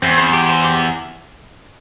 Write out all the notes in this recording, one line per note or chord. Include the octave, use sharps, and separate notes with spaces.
E2 C4
C5
G4
C5
G4